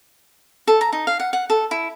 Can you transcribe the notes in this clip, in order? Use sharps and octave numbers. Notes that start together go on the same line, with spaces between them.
A4
A#5
D#4
F5
F#5
F#5
A4
E4